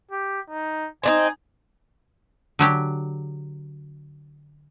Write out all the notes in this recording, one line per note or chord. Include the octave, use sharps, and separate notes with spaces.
G4
D#4
C4 D4 D#4 G#5
D3 F#3 G4